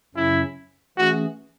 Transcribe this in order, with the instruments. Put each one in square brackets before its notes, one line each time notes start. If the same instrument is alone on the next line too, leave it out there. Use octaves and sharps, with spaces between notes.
[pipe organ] F#2 C#3 F#3 C#4 [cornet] E4
[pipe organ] E3 A3 C#4 G#4 [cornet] F#4